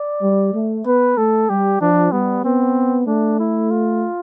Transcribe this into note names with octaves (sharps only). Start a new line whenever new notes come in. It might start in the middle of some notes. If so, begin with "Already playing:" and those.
Already playing: D5
G3
A3
B3 B4
A3 A4
G3 G4
F3 D4
G3 B3
B3 C4
A3 D4
E4
F4